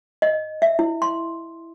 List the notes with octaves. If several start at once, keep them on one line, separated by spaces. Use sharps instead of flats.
D#5
E5
E4
C6